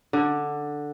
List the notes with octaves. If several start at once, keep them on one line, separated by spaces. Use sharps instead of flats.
D3